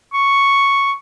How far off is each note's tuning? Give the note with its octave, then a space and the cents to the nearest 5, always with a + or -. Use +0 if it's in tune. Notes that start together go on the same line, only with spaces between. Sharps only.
C#6 +0